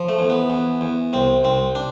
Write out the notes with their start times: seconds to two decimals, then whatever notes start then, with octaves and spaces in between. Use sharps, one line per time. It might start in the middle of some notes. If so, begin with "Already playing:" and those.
Already playing: F3
0.09 A3
0.19 E2
0.30 B3
0.50 E2
0.81 E2
1.13 C2 C4
1.44 C2 C4
1.75 D4